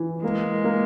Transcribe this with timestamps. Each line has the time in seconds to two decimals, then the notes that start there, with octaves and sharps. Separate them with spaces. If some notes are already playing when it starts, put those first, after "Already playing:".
Already playing: E3
0.24 G#3 A#3
0.64 A#3